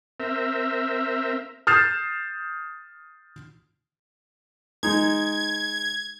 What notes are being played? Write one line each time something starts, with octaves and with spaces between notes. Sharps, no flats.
C4 A#4 E5
D#6 F6 G6 A6 C7 E7
G#3 D#4 G#6